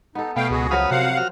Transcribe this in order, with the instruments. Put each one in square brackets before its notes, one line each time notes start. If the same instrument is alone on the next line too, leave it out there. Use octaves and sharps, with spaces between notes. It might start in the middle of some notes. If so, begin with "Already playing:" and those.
[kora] B3 A4 [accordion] D#4
[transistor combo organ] B2 [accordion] A3 F5 G5
[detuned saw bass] C#2 [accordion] F#4 G#4
[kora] F3 F#3 B3 [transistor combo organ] B4 F5 D#6
[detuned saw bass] C3 [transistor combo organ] F#4 [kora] A#4 C5 [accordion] F5 F#5
[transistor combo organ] F#4 F6